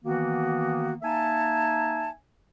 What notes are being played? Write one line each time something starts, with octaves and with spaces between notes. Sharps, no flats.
D#3 E3 A#3 B3 F#4
A#3 D#4 E5 G#5 A5